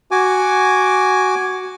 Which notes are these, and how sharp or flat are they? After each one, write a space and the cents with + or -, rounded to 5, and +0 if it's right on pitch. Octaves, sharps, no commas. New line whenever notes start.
F#4 +10 G#5 +0 D6 +0